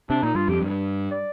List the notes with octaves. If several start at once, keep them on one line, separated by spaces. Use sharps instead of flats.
C3 D4
A#2 D#4
G2 F4
F2 G4
G2
D5